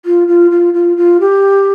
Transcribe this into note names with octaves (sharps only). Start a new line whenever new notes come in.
F4
F4
F4
F4
F4
G4